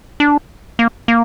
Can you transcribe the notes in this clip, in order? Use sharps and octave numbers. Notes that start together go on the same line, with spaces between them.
D4
A#3
A#3